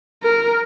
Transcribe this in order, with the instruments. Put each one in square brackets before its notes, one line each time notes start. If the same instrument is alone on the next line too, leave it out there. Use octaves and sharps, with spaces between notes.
[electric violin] A#4